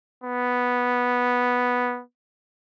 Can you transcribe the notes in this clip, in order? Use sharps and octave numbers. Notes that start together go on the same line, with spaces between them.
B3